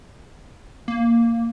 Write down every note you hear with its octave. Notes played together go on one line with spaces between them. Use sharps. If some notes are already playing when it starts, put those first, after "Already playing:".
A#3